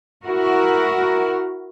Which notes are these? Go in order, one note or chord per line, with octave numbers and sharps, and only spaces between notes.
E4 F#4 A#4